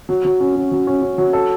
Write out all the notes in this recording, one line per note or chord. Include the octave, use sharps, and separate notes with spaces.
F#3
F#3
C#4
F#3
F#3
C#4
C#4
F#3
A4